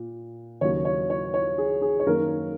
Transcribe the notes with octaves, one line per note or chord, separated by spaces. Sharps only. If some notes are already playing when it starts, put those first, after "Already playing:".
Already playing: A#2
D#2 C#3 F#3 A#3 C#5
C#5
C#5
C#5
G#4
G#4
C#5
F#2 D#3 A#3 A#4